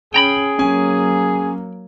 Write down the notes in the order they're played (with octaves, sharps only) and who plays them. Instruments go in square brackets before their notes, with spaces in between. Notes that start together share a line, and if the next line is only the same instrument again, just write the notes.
[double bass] C#4 [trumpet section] G#4 [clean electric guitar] G5 A#5 B5
[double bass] F#3 A#3 [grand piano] C#4 G#5